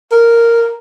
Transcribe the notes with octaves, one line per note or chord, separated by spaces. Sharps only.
A#4